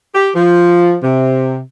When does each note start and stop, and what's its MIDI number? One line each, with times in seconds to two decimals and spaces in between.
0.15 0.29 67
0.35 0.96 53
1.03 1.58 48